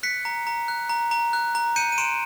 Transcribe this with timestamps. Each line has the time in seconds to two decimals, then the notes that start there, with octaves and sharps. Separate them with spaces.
0.03 F#6 B6 C#7
0.25 A#5
0.47 A#5
0.68 F#6
0.90 A#5
1.11 A#5
1.33 F#6
1.55 A#5
1.76 G6 C#7 D#7
1.92 D#7
1.98 C6 D7 E7